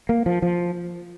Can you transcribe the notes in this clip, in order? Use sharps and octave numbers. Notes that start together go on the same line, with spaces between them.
A#3
F3
F3